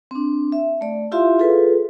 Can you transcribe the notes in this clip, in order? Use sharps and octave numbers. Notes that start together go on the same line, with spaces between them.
C4 D4
E5
A3 D5
E4 F4 G4 E5 F5 C6
F4 G#4 A4 B4